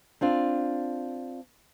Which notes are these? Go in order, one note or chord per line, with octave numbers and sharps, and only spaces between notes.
C4 D4 F4